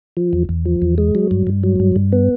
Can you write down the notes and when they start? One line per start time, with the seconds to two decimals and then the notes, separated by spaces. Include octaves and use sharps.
0.17 F3
0.33 E2
0.49 E2
0.65 F3
0.82 E2
0.98 G#3
1.15 F#3
1.31 G2
1.47 G2
1.63 F#3
1.80 G2
1.96 G2
2.12 B3